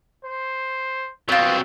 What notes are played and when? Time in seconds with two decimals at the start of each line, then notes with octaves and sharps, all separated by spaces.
0.25 C5
1.29 F#3 B3 C4 F4